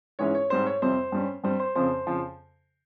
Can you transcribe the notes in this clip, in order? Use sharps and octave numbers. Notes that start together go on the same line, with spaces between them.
G#2 E3 G#3 C#4 C#5
C#5
G#2 G3 C4 C5
C#5
F2 C3 G3 C4 C5
G2 G3 C#4
G2 G3 C4 C5
C5
F2 C#3 F3 C4 C5
F2 C#3 F3